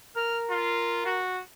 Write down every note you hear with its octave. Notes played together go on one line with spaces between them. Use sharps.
A#4 F6
F4
F#4